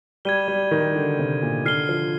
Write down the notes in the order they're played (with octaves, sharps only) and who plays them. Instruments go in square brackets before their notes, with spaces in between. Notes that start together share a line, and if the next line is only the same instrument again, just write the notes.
[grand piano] G3 [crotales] G#6 D#7 G7
[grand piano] G3
D#3
D3
C3
A#2
[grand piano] D3 [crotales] F6 C7 G7
[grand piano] F3